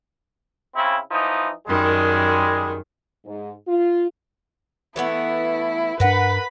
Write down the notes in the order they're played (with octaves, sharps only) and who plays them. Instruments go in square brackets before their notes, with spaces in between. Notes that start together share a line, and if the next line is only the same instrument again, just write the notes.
[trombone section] C#3 C4 E4
E3 F3 D#4
[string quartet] F#2 D#3 [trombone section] G3 G#3
[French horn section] G#2
F4
[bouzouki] E3 A3 B3 [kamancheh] E4
[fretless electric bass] G2 D4 [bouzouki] A#4 F#5 [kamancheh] B4 B5